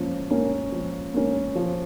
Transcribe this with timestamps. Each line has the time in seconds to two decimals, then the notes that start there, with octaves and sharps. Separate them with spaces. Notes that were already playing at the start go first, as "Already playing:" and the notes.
Already playing: F3 A#3 C#4
0.31 A#3 C#4
0.72 F3
1.14 A#3 C#4
1.55 F3